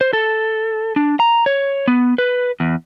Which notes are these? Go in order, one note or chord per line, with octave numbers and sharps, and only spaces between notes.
C5
A4
D4
A#5
C#5
B3
B4
E2